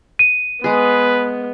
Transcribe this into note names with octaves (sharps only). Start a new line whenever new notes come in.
D#7
G#3 B3 G#4 B4